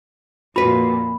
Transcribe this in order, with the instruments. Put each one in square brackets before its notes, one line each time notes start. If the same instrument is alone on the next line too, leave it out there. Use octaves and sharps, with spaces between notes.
[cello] F2 A#2 [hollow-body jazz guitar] F#4 B4 [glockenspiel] B5